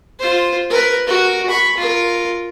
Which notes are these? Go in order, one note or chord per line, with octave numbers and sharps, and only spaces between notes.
F4 C5
A#4 B4
F#4 A#4
B5 C#6
F4 A#4